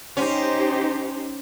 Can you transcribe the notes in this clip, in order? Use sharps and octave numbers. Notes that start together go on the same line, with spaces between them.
C#4 D#4 G4 C5